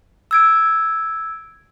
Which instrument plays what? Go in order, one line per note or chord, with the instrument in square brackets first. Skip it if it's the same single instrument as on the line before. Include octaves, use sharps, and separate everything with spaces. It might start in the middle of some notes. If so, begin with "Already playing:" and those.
[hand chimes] E6 G#6 D7